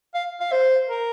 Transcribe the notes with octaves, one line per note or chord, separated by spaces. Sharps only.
F5
F5
C5
A#4